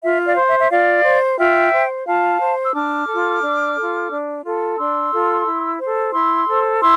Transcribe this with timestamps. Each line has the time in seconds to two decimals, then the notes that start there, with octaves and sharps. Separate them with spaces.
0.02 F4 E5
0.25 D5 F5
0.36 C5
0.48 E5
0.60 E5
0.70 F4 D5 F5
1.04 C5
1.38 F4 E5 G5
1.72 C5
2.06 F4 F5 A5
2.40 C5
2.63 E6
2.74 D4 D6 F6
3.08 F4 A4
3.42 D4
3.76 F4 A4
4.10 D4
4.44 F4 A4
4.77 D4 C6 E6
5.12 F4 A4
5.45 E4
5.79 A4 C5
6.13 E4 C6 E6
6.47 A4 C5
6.81 E4 C6 E6